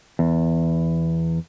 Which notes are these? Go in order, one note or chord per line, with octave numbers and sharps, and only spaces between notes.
E2